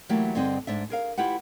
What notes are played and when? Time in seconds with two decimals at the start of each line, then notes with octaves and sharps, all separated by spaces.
0.09 E3 F#3 A3 A#3 G4
0.35 G2 D3 C4 G#4 D#5
0.67 G#2 D4 E5
0.90 G#4 A#4 F5
1.17 E4 F4 G4 B4 F#5